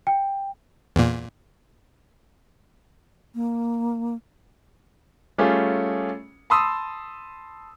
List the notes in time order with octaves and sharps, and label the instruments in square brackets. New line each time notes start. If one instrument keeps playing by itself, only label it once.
[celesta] G5
[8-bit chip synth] E2 A#2
[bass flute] A#3
[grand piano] G3 A3 C#4 F4 G#4
A5 B5 C6 D#6 E6